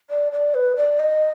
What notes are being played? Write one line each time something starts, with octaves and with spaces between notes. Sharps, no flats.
D5
D5
B4
D5
D#5